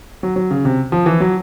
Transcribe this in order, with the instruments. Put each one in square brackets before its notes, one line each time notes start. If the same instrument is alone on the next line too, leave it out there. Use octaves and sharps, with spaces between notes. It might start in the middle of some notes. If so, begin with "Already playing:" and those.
[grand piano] F#3
F#3
C#3
C3
F3
E3
F#3